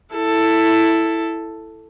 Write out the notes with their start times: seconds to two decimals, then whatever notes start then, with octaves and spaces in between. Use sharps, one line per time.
0.15 E4 A4